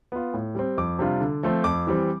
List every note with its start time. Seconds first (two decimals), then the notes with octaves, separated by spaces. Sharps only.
0.12 B3 F4
0.34 A2
0.55 G3 C4
0.77 F2 D6
0.99 C3 G3 D4 F4
1.21 D3
1.43 F3 A3 C4
1.64 F2 D6
1.87 E3 G3 C4